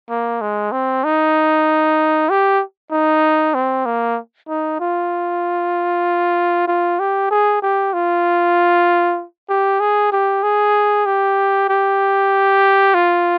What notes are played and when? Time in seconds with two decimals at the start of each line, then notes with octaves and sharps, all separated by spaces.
0.09 A#3
0.41 G#3
0.72 C4
1.04 D#4
2.30 G4
2.91 D#4
3.54 C4
3.86 A#3
4.49 D#4
4.80 F4
6.67 F4
6.99 G4
7.31 G#4
7.62 G4
7.93 F4
9.49 G4
9.80 G#4
10.12 G4
10.43 G#4
11.06 G4
11.69 G4
12.94 F4